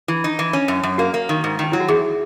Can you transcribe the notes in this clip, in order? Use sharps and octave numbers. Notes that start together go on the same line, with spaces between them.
E3 E4
D#4
E3
C#4
F#2
F#2
A#3 F#4
A#3
D#3
G#2
D#3
D#4
F#3 E4
F#4
E2 G#4